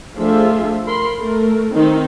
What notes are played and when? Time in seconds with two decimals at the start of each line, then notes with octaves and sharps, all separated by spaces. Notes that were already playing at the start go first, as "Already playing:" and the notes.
0.16 F3 A3 D4 F4 G#4 E5
0.86 A#4 B5 C6
1.19 A3 A#4
1.75 D#3 C4 D#4